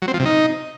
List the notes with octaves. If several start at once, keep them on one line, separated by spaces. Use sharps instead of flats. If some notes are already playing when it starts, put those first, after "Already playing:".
F#3
C4
F3
C3
D#4